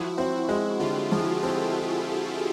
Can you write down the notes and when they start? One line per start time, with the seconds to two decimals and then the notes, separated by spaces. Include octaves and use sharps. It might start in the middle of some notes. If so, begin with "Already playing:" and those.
Already playing: F3 E4 F#4
0.18 C4 E4 F#4
0.49 G#3 E4 F#4
0.80 D3 F4 G4
1.11 F3 F#4 G#4
1.42 C4 G4 A4